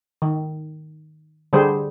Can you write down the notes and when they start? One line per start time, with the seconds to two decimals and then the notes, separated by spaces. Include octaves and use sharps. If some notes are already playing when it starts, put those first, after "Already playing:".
0.22 D#3
1.53 D3 G3 G#4 C5